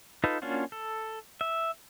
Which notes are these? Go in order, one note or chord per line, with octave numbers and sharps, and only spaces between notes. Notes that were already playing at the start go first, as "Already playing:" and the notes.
D#4 F4 A4 B4
A#3 C#4 D4 F4 F#4
A4
E5